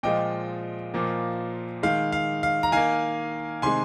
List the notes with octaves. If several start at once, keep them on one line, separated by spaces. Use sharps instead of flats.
A#2 F3 G#3 D#5 G5
A#2 F3 A#3
D#3 G#3 F5
F5
F5
A#5
D#3 A#3 F5 G#5
C3 D#3 G#3 G#5 C6